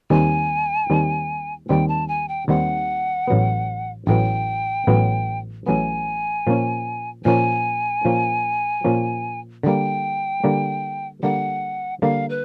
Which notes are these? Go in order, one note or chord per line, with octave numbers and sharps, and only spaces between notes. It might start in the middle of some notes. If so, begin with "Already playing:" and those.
D#2 D#3 G3 C4 G#5
D#2 D#3 G3 C4
D#2 D#3 G3 C4 G5
A5
G#5
G5
D#2 D#3 G3 C4 F#5
A1 A2 F#3 B3
A1 A2 F#3 B3 G5
A1 A2 F#3 B3
A1 A2 F#3 B3 G#5
A#2 F3 A#3 C#4
A#2 F3 A#3 C#4 G#5
A#2 F3 A#3 C#4
A#2 F3 A#3 C#4
D3 G3 A#3 G5
D3 G3 A#3
D3 G3 A#3 F#5
D3 G3 A#3 F5
B4